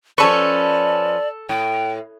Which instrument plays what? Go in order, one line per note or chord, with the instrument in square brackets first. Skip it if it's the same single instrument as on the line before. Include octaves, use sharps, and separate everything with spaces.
[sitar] F3 C#4 B4 [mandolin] A4 C#6 [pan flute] D5
[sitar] A2 [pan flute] G5